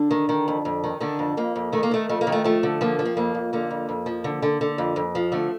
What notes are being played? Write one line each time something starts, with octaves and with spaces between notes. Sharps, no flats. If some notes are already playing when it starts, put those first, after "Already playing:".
Already playing: D3 D4
D#3
D#3
F2
F2
D#3
D3 D#3 D4
F2
F2 A#3
F2
D#3 A3
A#3
D#3 A3
F2 A3
A#3
D#3
A3
F3 A3
D3
F3 A#3
F3
C4
F2 A#3
F2
D3 A#3
F2
F2
F3
D3
D3
D3
F2
F2
F3
D3 A3